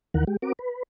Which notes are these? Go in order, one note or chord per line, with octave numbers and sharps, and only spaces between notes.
D#2 D#3 E3 A#4 F#5
G#3 G4
C4 F#4 A#4 D6
B4